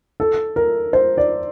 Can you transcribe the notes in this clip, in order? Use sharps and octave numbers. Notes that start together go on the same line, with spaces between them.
A4
A#4
C5
D5